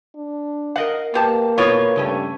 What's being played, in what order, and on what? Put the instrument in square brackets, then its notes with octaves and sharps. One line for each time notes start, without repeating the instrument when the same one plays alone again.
[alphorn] D4
[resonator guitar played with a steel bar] A#4 D#5 F5 [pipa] F#5
[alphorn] A#3 [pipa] B3 G4 A5
[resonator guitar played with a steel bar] B2 B3 F4 [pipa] E4 B4 C#5
[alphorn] G2 [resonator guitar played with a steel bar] C#3 A3 C#4